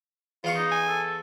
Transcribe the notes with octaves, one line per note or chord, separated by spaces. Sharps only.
E2 F4 F5 C#6
D#4
G#5
A4